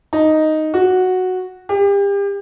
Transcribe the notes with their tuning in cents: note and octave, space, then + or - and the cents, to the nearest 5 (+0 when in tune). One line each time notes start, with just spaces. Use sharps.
D#4 +0
F#4 -5
G4 +35